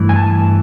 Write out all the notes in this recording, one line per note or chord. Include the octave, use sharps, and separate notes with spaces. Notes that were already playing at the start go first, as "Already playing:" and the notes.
Already playing: G2 E3 A3
G#5
A5